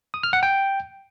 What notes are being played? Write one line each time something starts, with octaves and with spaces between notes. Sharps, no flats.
D#6
F6
F#5
G5